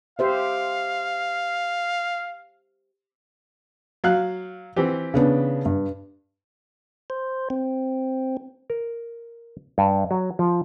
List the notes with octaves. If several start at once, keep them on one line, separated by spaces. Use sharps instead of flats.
G4 C5 E5 F5
F#3 F5 F#6
E3 C4 G4
C#3 B3 D4
G2
C5
C4
A#4
G2
F#3
F3